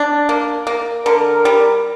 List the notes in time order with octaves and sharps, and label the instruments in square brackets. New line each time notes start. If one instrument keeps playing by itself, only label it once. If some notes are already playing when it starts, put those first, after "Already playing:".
Already playing: [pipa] D4
A#3
A#3
[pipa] D3 [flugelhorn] A#4
[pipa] G3